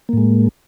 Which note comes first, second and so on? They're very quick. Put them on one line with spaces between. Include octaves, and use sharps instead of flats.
A#3 A2 G#3